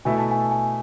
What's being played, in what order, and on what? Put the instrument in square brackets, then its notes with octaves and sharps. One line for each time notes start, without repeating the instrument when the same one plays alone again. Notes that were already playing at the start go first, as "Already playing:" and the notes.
[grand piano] B2 A3 E4 [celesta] G#5
[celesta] A5
G#5
G#5